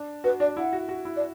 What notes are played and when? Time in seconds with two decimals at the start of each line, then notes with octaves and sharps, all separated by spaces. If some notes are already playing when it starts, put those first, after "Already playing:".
Already playing: D4
0.24 F#4 B4
0.40 D4 D5
0.57 E4 F#5
0.73 F#4
0.89 F#4
1.05 E4
1.16 D5